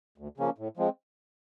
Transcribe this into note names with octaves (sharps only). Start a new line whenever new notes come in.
D2
C#3 F3 A#3 C#4
A2
F3 G#3 C4